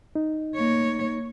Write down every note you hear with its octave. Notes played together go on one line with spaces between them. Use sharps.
D#4
A#3 C#5